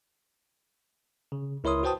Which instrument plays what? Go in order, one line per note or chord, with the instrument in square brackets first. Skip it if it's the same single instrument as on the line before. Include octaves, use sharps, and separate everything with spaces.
[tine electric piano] C#3
C#2 E4 A#4 C#5 C6 D#6
F#4 B4 C5 G5 A5 D#6